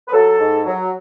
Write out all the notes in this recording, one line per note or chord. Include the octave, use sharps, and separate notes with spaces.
B4
F#3 A4
G#2
F#3